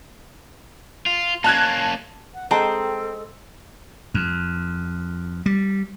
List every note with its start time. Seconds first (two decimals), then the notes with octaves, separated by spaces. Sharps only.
1.06 F4
1.44 A#3 C#4 A5 F#6 G#6
2.34 F#5
2.51 G#3 C4 A4 G5 A5 A#5
4.14 F2
5.46 G3